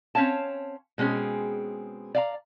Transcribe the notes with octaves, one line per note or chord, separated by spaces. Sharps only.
C4 C#4 C#5 F5 A5
B2 G#3 C4 C#4 G#4
D5 F5 A#5